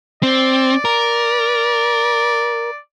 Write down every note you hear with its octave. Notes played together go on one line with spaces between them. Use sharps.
C4 D5
A#4